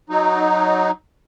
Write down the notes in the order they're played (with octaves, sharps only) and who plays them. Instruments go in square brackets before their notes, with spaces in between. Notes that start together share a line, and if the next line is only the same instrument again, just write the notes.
[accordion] F#3 D#4